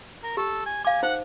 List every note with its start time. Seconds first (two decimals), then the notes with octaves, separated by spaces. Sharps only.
0.23 A#4
0.37 G4 A4
0.66 G#5
0.85 F5 G#5 D6
1.03 D#4 C5 F#5